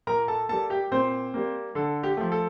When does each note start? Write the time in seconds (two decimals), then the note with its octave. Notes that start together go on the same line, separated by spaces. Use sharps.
0.07 A#2 A#4 A#5
0.28 A4 A5
0.49 G3 A#3 A4 A5
0.70 G4 G5
0.91 A#2 C4 C5
1.34 G3 A#3
1.75 D3 A4
2.03 G4
2.17 F3 A3
2.32 A4